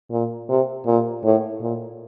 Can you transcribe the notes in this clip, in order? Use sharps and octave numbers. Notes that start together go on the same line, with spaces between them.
A#2
C3
A#2
A2
A#2